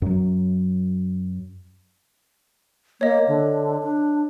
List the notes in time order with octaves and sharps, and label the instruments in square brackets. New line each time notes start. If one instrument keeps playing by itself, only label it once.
[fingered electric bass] F#2 F#3
[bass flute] A#3 [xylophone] C#5 D#5
[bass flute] D3
D4